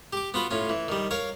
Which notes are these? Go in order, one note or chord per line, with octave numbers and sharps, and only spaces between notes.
G4 D6
B3 F4 F#4 B4
A2 C#4 F4
E3
D#3 G3
A#4 C#5 F5